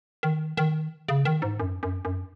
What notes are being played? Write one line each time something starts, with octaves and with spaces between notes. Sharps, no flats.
D#3
D#3
C#3
D#3
G#2
F#2
F#2
F#2